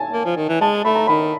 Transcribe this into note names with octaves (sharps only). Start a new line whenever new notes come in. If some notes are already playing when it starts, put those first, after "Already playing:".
Already playing: G#5 A5
A#3
F3
D#3
E3
G#3 A5
A3 B5
A#5
D#3 B5